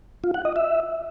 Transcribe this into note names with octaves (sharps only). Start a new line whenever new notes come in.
F4
F#5
D#5
E5